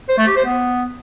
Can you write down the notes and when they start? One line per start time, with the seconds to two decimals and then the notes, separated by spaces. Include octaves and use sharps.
0.09 C5
0.18 A3
0.27 G4
0.36 C5
0.45 B3